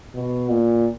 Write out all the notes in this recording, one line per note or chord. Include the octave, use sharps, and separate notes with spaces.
B2
A#2